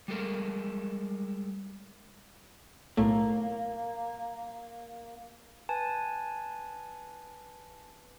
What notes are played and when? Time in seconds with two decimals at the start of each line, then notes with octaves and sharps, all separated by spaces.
0.08 G3 G#3 A4 A#4
2.97 B1 A2 A3 A#3
5.69 B4 G#5 A5